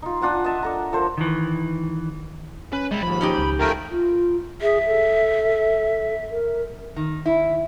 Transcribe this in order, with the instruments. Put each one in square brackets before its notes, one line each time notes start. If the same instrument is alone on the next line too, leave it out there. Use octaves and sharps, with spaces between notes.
[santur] D#4 F4
D4 F4 F#5 G#5
D#5 E5 A5
D4 A4 A#5
F3 A4 A#4 C5
[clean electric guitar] D#3 E3
[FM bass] C#4 [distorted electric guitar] B4
[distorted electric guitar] G3 E4 [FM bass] G#3
[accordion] D#2 G#2 [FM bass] F3 [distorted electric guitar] B5
[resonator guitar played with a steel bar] C#4 D#4 G4
[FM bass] C#2
[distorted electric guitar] F#2 F3 [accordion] A3 A#4 G5
[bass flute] F4
[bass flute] G#4 [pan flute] E5
[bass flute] A4
A#4
[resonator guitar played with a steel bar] D#3
E4